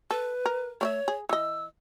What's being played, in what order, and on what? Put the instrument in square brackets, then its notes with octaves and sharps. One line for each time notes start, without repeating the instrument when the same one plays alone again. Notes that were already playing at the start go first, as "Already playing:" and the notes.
[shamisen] A4 [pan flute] B4
[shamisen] A#4
[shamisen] A3 D5 E5 [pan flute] C#5
[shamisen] G#4
[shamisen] E3 D#5 [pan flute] E6